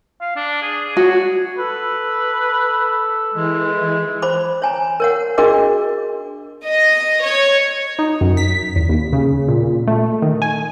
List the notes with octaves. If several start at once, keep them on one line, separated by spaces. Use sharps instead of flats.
F5
D4
G#4
F#4 C#5
A4 B4
E3 G#3
C5 B5 D6
C#5 G#5 A#5
A#4 C#5 F#5
D4 F#4 G#4 A#4 D#5 D6
D#5
C#5
D#4
F#2
B6
E2
D#2
C#3
A#2
A3
D#3
G#5